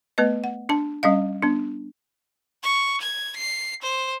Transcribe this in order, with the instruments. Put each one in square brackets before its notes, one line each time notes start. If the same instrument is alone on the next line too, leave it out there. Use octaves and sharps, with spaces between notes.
[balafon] A3 B3 B4 D#5
F#5
D4 A5
G3 C#4 D#5 F5
B3 D4
[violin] C#6
G#6
C7
C5